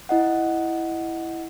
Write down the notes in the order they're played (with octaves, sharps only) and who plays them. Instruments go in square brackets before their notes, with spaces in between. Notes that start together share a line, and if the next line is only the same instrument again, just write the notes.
[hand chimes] E4 D#5 F#5